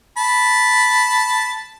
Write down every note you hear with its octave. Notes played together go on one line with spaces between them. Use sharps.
A5 B5